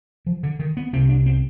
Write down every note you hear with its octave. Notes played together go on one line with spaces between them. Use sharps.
F3
D3
D#3
B3
C2 C3 C4
D4
C4